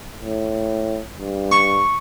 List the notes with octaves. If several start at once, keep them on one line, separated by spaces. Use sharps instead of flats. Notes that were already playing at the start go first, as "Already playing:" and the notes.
A2
G2
C#6